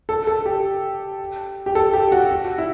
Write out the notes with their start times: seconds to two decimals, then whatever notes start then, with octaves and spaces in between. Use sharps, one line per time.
0.09 A4
0.27 A4
0.46 G4
1.66 G4
1.75 A4
1.93 G4
2.12 F#4
2.31 F#4
2.58 E4